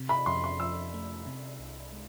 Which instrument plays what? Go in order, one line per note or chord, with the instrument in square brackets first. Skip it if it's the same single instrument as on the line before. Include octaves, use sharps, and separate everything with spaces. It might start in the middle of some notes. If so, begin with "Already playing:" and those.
Already playing: [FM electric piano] C3
[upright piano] B5
[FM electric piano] F2 [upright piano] C6
[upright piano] C6
[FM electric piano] F3 [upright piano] E6
[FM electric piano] A3
C3
C2
G#3